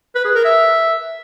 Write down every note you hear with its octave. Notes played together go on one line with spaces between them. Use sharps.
B4
G#4
A#4
E5